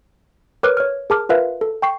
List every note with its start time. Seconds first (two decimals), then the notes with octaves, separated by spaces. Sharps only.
0.63 A#4 B4 C#5 D6 F6 F#6
0.77 C#5 F6
1.10 G#4 A#4 A5 D6 F6
1.29 F4 A#4 B4 E5 F5
1.61 A4
1.82 G5 C#6 C7